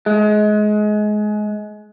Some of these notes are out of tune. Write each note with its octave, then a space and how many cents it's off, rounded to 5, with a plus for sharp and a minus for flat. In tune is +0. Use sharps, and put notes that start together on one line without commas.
G#3 +25